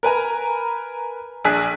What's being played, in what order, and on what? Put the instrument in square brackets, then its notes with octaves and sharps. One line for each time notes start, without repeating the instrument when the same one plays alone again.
[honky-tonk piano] A#4 B4 G#5 A#5
A#1 D4 G#4 F#6 B6